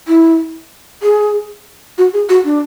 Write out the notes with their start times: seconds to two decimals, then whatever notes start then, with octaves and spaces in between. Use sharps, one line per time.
0.08 E4
1.03 G#4
1.98 F#4
2.14 G#4
2.29 F#4
2.45 D4